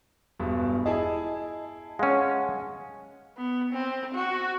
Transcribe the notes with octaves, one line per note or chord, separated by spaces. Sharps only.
E1 G2 B2
E4 G#4 D#5 A5
G#3 C#4 F5 F#5 G#5
B3
C4
F#4